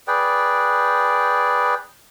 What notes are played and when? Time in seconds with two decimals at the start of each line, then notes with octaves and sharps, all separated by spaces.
0.08 G#4 B4 D5 G5